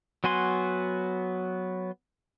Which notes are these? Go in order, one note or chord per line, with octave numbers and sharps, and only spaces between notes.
F#3 B3 F#4 G#5 C6